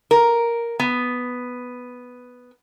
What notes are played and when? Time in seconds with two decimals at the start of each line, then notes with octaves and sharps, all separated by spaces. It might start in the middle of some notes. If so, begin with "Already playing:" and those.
0.11 A#4
0.80 B3